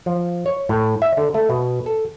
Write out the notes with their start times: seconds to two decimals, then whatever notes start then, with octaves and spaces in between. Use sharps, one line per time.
0.06 F3
0.46 C#5
0.69 A2
1.02 E5
1.17 D3
1.34 A3
1.50 B2
1.86 A4